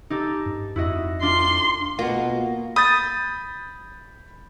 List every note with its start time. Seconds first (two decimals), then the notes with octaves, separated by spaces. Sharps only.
0.10 D#4 G4 A4
0.46 G2
0.76 F2 E4 F#4 D#5
1.22 D4 F4 C6
1.99 B2 A#3 F4 F#4
2.76 B5 D#6 G6 A6